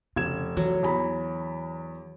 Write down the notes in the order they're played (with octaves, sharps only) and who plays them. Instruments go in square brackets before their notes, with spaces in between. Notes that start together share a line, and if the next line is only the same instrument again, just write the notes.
[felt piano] F1 G#6 E7 [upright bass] C#3
[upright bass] E3 [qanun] F#3
[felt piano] E2 A#5 B5